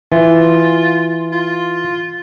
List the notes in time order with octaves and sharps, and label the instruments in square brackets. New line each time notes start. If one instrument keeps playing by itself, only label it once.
[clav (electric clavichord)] E3 [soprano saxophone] F4
[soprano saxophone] F4